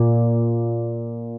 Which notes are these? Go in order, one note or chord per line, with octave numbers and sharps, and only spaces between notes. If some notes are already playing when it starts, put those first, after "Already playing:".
Already playing: A#2